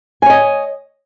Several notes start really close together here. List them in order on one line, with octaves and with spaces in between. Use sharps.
G#5 C#5 D#5